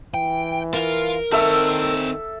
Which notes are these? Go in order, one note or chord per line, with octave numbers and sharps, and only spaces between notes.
E3 G5
F4 A#4 F5
D#3 C4 A4 C#5 E5 E6